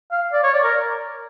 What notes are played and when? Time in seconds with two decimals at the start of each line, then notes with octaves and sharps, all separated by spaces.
0.12 F5
0.33 D5
0.44 C#5
0.54 D5
0.64 A#4